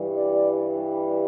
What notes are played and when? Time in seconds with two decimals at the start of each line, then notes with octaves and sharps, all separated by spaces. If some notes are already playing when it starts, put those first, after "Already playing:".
Already playing: G2 E3 G3
0.17 D5